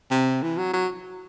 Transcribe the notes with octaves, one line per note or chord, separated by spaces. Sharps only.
C3
E3
F#3
F#3